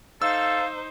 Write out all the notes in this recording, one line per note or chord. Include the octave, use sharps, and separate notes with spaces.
D#4 A4 C5 F5 E6